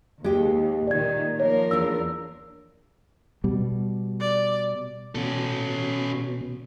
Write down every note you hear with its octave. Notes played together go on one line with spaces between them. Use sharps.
D#2 G#3 G4
A#2 D#3 D5 G#6
F3 A#3 A#4 C#5
E2 D4 E6
B2 G3
D5
B2 C#4 A4